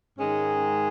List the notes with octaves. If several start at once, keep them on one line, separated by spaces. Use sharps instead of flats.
G#2 D#3 G#3 C#4